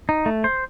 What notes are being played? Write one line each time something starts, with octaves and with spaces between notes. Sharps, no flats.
D#4
A3
C5